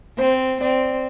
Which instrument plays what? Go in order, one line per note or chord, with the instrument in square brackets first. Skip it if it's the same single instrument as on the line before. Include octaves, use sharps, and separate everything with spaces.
[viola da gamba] C4 [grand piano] C5
[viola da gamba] C4 [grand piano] D5